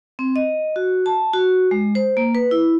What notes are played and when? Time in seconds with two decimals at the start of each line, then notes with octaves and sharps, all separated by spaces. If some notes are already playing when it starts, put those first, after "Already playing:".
0.19 C4
0.36 D#5
0.76 F#4
1.06 A5
1.33 F#4
1.71 G#3
1.95 C5
2.17 A#3
2.35 B4
2.51 E4